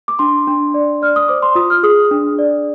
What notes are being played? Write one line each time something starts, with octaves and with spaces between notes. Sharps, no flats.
D6
D4 C6
D4
D5
D5 F6
D#6
C5 D6
C6
F4 D#6
F6
G#4 D#6
D4
D5